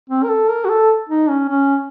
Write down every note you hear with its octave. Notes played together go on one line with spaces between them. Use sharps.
C4
A#4
A4
A#4
F#4
A4
D#4
C#4
C#4